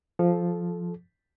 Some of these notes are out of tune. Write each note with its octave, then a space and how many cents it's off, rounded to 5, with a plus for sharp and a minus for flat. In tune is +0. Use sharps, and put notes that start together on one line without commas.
F3 +0 A4 -25